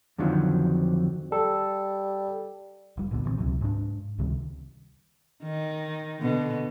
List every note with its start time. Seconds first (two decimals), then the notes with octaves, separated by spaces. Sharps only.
0.18 F2 D3 D#3 F3 F#3
1.32 G3 A4
2.97 F1 G3
3.11 C#2 A#2 D3 B3
3.24 A#2 E3 G#3 C4
3.38 C#2 C3 F#3
3.61 G#2 D4
4.18 C#2 C3 D#3 G3
5.43 D#3
6.22 B2 D3